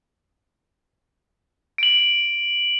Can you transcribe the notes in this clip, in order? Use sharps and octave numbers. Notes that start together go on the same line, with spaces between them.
D7 F#7